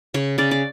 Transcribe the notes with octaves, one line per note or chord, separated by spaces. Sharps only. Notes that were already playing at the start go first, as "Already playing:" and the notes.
C#3 C#5
C#3 D5
D5